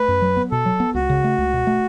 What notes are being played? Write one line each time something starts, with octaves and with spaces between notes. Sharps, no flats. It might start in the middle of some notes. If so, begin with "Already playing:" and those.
Already playing: A3 B4
F#2
F#3
B3
B2 A4
F#3
B3
C#2 F#4
C#3
A3
C#2
B2
A3